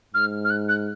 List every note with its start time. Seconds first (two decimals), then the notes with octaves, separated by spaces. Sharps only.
0.14 G#2 F6
0.44 F6
0.50 F#6
0.68 F#6